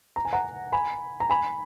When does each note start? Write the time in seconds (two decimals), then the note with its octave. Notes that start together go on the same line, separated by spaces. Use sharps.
0.16 A#5
0.25 G#5
0.33 F#5 A#5
0.72 G#5 B5
1.20 A#5
1.30 G#5 B5